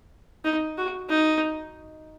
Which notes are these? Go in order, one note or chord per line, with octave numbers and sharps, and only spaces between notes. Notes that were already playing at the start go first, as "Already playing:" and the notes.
D#4
F#4
D#4